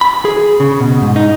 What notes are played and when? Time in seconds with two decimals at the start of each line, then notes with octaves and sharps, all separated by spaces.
0.01 B5
0.25 G#4
0.60 C#3
0.80 B2
1.02 G#2
1.16 D#4